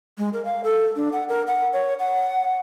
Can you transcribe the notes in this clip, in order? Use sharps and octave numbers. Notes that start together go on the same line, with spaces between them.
G#3
A#4
F5
A4
D4
F#5
A#4
F#5
C#5
F#5